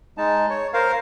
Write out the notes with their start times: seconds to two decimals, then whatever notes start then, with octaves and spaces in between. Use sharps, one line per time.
0.18 G#3 D#4 A5
0.50 C#5
0.74 A#4 C5 F5